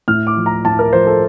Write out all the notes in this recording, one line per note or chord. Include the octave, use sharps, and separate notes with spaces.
A2 F6
D6
F3
A#5
A2 A5
A#4
F3 C5
A4